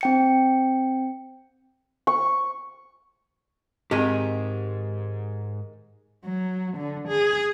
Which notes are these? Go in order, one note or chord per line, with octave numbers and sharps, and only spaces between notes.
C4 G5 C#7
C#6
G#2 D#3 G#3 C4 G4 G#4 G#5
F#3
D3
G#4